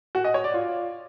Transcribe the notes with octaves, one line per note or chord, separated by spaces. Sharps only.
F#4
D#5
C#5
D5
F4